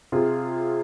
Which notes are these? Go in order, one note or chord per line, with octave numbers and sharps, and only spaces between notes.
C3 F4 G#4